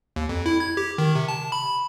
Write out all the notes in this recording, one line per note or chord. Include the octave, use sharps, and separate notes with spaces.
D#2
F2
E4
G#6
G4
D#3
C3
A5
B5